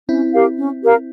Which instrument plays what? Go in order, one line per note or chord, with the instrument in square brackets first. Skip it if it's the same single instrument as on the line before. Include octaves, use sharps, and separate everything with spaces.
[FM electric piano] C4 E4 [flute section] C#4
[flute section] G4 A#4 F5
C#4
G4 A#4 F5